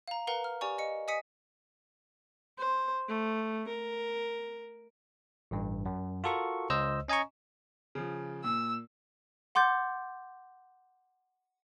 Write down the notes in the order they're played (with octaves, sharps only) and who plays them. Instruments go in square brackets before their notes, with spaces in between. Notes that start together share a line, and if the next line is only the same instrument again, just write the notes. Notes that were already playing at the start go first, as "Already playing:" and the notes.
[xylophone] F5 A#5
A#4 B4 F5 F#5 A#5
F6
G4 D5 G#5 C#6
D#5 C#7
D#5 G#5 D#6 B6 C#7
[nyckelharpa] C5
A3
A#4
[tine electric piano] A1 G2
F#2
F4 F#4 A4 A#4 C#6
C#2 C5 D#5 E6
C#4 D#5 G#5 A#5 C#6
[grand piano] C#3 F3
[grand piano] A#2 [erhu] E6
[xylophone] F#5 C6 D6 G6 A6